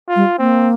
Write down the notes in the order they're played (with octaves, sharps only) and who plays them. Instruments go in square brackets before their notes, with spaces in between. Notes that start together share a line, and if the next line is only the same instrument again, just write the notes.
[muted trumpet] F4
[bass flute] G3
[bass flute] A#3 [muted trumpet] C4